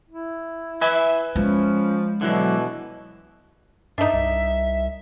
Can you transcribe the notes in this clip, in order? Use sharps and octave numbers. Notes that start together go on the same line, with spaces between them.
E4
B4 E5 G#5
F3 G#3 C#4
B2 D3 E3 F#3
G2 D4 D#4 E5
C2